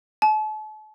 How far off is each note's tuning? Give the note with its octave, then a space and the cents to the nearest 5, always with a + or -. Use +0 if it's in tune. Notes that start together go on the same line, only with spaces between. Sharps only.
A5 -40